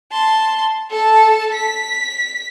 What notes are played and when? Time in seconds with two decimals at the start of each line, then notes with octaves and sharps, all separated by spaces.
0.12 A5 C6
0.90 A4 A5
1.54 B6